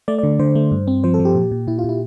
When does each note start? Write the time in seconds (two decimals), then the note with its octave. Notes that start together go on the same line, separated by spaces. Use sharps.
0.08 A3 D5
0.18 D3 D5
0.39 D3 C5
0.55 A3
0.72 G2
0.88 C4
1.04 F3 C5
1.14 A4
1.19 F3
1.25 G4
1.35 A#2
1.51 A#2
1.67 A#2 E4
1.79 F4
1.84 A#2
1.89 E4